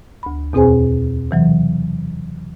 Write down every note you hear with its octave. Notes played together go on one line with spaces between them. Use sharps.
D2 B5
E2 B2 C4 G#4 C5 G#5
C3 E3 F#3